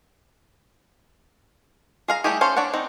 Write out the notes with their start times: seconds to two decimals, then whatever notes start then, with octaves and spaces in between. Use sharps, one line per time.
2.08 G#4 F5 A#5
2.24 G3 A3 E4 G4 G#4
2.41 C#4 A4 C5 C#5 F5
2.56 D4 C#5 D5 F#5
2.73 C4 D#4